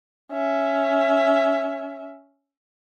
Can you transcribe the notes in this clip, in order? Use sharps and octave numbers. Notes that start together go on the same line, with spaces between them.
C#4 E5